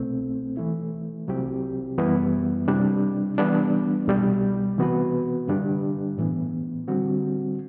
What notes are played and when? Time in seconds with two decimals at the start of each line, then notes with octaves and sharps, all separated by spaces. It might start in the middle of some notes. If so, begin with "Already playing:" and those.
Already playing: C2 B2 A3 C4
0.57 E3 A3 E4
1.28 C2 C3 F#3 C4 G4
1.98 F#2 E3 G3 B3 E4
2.68 C3 G3 D4
3.38 E3 G3 B3 D4
4.07 C2 B2 G3
4.78 C3 E3 B3 F#4 B4
5.48 G2 D3 G3 D4 G4
6.18 A2 E3 B3
6.88 D3 G3 C4 F#4